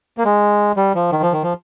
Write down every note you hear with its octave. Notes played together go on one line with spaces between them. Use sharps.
A#3
G#3
G3
F3
D#3
F3
D#3
F3